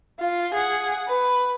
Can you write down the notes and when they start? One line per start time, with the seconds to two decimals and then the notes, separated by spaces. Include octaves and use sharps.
0.20 F4
0.54 G#4 F#5
1.08 B4